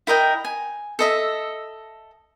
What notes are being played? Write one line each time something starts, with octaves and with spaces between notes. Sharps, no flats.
E4 A#4 D#5 G5
G#5
A4 D#5 E5